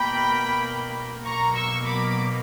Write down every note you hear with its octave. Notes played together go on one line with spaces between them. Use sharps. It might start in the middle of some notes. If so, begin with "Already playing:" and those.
Already playing: B2 A#3 G5 B5
B2 F#3 A#3 A#5 C#6
C#6 E6
B5 D6